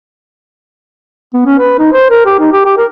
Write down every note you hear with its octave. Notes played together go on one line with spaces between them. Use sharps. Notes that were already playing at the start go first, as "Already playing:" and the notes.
B3
C#4
B4
D#4
C5
A#4
G4
D#4
G4
G4
A#4